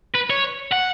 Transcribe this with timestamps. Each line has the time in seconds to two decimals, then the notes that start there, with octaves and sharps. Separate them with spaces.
0.14 B4
0.30 C#5
0.72 F#5